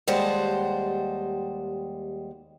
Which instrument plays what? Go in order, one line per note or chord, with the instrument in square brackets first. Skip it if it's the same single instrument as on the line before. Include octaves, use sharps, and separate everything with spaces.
[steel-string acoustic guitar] D#2 G3 G#3 C5 F#5 A5